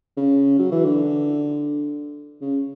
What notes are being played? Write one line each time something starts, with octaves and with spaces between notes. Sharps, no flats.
C#3
F#3
E3
D3
C#3